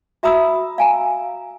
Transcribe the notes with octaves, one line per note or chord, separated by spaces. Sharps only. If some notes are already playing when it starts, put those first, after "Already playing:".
F#4 E5 A#5 B5 D#6 E6
F5 G#5 A#5